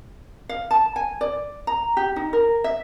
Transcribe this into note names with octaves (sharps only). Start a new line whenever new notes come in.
F5
A5
G#5
D5
A#5
G4
D#4
A#4
E5